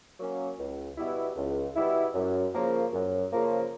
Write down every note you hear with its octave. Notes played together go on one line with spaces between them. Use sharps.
F#3 A#3 C#4
C#2
B2 G3 B3 E4
C#2
B2 G3 B3 E4
F#2
C#3 F3 A#3
F#2
C#3 F3 A#3